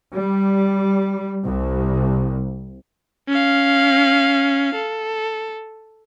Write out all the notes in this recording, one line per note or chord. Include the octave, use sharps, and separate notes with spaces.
G3
C2
C#4 F5
A4